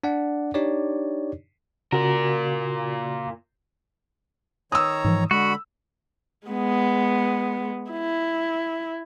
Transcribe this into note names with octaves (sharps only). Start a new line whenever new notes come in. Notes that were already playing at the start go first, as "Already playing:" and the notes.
D4 D5 F#5
D4 D#4 G4 C#5 D5
A#2 C#3 F#4 A#4
D#3 C#5 A#5 D#6 E6
G#2 E3 F3
D3 G#3 F#4 B5
G#3 B3
E4